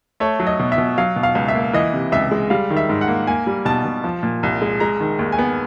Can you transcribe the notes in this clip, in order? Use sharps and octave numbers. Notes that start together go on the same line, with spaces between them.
A3 C#5
F#3
D#5
B2
E5
B2
F#3 F5
B2
F5
C#2
E5
A#3
E3 D#5
C3
C#2 E5
G#3
G3 F5
D#3
E5
G#2
F#5
A#3
A#3 G#5
G3
B2 A5
B2
F3
A#2
C2
G#3
G#3 A#5
D#3
D#2
G#5
B3